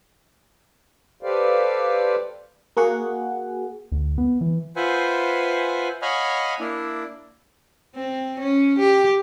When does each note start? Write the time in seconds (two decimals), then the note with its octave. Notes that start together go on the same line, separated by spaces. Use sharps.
1.23 G4 A4 B4 C5 D5 F5
2.77 A#3 F#4 G#4 F#5
3.92 D2
4.18 B3
4.41 E3
4.76 F4 B4 C5 E5 F#5 G#5
6.02 C#5 D#5 F5 F#5 G#5 B5
6.60 A#3 D4 E4
7.95 C4
8.39 C#4
8.79 G4